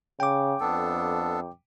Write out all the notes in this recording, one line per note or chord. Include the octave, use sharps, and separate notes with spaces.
C#3 G5 D6
F2 B3 D4 A4